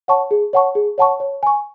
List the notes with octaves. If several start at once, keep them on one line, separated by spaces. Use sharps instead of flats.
C#5 F#5 A5 C#6
G#4
C#5 F#5 A5 C#6
G#4
C#5 F#5 A5 C#6
C#5
G#5 C#6